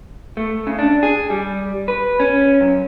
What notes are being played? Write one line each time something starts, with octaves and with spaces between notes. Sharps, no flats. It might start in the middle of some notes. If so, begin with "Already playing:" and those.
A3
C#3
D4
G#4
G3
B4
C#4
F#2